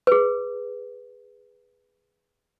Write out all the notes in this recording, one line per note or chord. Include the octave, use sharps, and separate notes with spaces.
G#4 B4